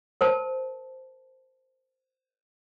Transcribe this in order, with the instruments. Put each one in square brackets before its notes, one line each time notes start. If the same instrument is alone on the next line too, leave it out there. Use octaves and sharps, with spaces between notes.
[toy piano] A#4 C5 A5